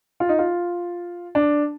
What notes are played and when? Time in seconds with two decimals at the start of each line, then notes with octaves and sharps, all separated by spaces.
0.20 F4
0.29 D#4
0.39 F4
1.35 D4